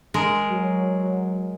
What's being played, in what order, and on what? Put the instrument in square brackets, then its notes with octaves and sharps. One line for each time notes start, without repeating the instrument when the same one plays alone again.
[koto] G#3 A#4
[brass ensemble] F#3